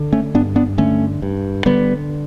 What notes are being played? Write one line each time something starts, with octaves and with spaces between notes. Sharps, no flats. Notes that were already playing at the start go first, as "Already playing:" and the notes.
Already playing: D3
A3 C#4
G2 B3 D4
B3 D4
D3 A3 C#4
G2
D3 G3 B3